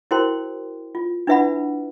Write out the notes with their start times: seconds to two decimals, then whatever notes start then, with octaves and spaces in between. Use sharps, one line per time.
0.11 E4 F#4 A#4 C5 G5 C6
0.95 F4
1.27 D4 E4 B4 E5 F#5 B5